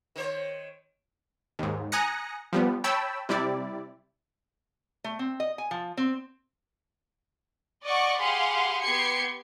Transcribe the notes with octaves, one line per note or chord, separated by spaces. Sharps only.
D#3 C5 C#5
D#2 G#2
G#5 A#5 D#6 F#6 A#6 C#7
F3 G3 B3
C#5 G5 A5 B5 E6
C3 G3 E4 D5
A3
C4
D#5
G#5
F3
C4
D5 D#5 F#5 C#6 D6
G4 G#4 F5 F#5 B5 C6
B3 G4 C6 G#6 C7 C#7